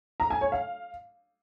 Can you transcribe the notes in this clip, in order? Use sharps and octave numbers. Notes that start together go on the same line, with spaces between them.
A#5
G#5
C#5
F5